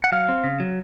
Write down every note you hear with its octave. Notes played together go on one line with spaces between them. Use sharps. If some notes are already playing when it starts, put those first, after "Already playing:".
F#5
F#3 F5
C4
C#3
F#3